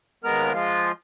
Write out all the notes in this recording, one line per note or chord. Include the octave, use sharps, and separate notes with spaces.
D#2 G#3 B3 A#4 F6
F3 G#3 F4